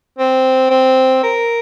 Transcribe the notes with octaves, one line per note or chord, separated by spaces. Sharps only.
C4
C4
A#4